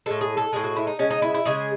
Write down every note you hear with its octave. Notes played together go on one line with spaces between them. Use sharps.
A2 G#3 A4
G#4
A4
A2 G#3 G#4
F#4
E4
D#4
C#3 G#3 C#4
D#4
E4
E4
C#3 G#3 G#4